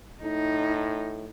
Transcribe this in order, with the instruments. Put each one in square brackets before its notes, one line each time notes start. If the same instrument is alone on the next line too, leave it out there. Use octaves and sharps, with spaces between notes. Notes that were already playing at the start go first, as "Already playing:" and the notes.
[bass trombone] A2 [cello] D#4